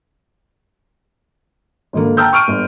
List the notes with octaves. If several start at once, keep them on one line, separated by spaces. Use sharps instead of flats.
G#1 D3 A#3
G5 A5 A#5 E6 F6 G6
C#6 F6 D7 D#7
G1